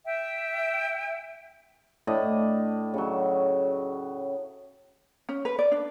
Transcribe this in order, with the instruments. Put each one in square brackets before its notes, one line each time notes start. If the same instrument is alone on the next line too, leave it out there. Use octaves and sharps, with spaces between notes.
[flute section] E5 G5
[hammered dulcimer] A2 D4 D#5
C#3 F#3
[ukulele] C#4
B4
D5
D4